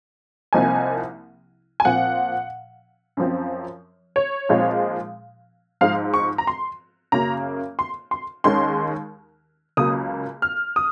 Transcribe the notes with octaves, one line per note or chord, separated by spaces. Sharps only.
C2 C3 F3 A#3 D#4 G#5
G#5
A#2 F3 C4 F#5
F#2 F3 C4
C#5
A#2 F3 G#3 C4 D#4
G#2 F3 G#3 F5
C#6
A#5
C6
F#2 C#3 F#3 A#3 A#5
C6
C6
D#2 D#3 G#3 C#4 C6
C#2 C#3 F#3 A#3 D#6
F6
D#6